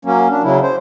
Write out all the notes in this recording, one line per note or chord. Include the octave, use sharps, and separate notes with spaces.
F#3 A#3 C#4
D4
C#3 F#3 E4
C5